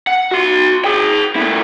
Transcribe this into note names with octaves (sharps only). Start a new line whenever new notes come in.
F#5
F#4 C6
G#4 G5
A#2 E4